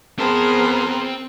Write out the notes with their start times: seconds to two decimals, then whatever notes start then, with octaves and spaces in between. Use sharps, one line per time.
0.19 B3 C4 G#4 A#4 C5 A5